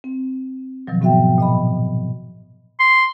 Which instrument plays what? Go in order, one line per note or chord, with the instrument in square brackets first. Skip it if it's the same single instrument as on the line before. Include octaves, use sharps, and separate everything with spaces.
[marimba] C4
B2 D#3 F3 F#3
G#2 B3 F#4 E5 G5
A#2 D#5 B5
[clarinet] C6